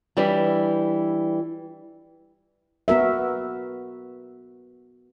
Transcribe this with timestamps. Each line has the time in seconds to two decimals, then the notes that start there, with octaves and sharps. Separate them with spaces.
0.17 E3 G3 D4
2.88 B3 F#4 A#4 E5